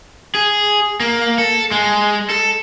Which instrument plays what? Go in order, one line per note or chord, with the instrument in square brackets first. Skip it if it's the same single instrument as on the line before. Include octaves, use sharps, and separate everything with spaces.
[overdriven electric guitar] G#4
A#3
A4
G#3
A4